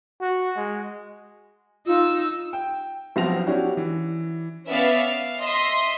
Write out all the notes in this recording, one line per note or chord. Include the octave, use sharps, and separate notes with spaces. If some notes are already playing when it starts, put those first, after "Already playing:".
F#4
G#3
D#4 F4 E6
G5
B1 F3 B3 C4 A#6 F7
C#4 D4 E4 F#4 G4 C#5
E3
B3 C#4 D5 E5 F5
F5
D#5 E5 C6